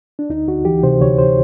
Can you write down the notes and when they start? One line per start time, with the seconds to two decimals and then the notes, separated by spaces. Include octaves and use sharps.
0.19 D4
0.30 D2 D#4
0.48 D2 F#4
0.65 E3 G4
0.83 C3 C5
1.01 D2 C#5
1.18 C5